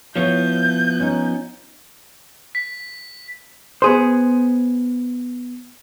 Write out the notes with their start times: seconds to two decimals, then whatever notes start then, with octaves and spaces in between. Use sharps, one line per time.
0.16 F3 B3 E4 C#5 G6
1.00 C#4 D#4
2.55 B6
3.82 B3 G#4 C5